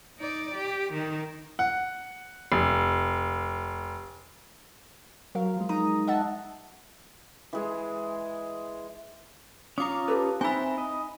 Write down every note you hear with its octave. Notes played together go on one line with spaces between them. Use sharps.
D#4 D5
G4
D#3
F#5
F1
F#3 A#4 F5
F3 G#3
G#3 D#4 A#5 D#6
D#5 E5 F#5 A5
E3 G#3 G#4
C#4 F4 A#5 D6 D#6
G4 A4 B4
C4 D#4 E4 E5 G#5 B5
D#5